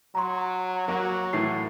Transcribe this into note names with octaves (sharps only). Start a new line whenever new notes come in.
F#3 A#5 C6
F#3 A#3 F#4
A2 E3 A3 C7